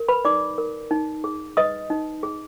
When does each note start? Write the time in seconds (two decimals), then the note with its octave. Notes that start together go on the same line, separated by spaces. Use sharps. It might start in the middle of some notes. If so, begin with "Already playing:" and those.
Already playing: A#4
0.08 B4 B5
0.25 D#4 D5 D6
0.58 A#4
0.91 D#4
1.24 G#4
1.57 B4 D#5 D#6
1.90 D#4
2.23 G#4